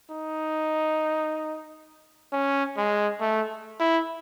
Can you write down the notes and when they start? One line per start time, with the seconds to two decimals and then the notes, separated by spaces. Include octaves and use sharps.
0.10 D#4
2.33 C#4
2.77 G#3
3.21 A3
3.80 E4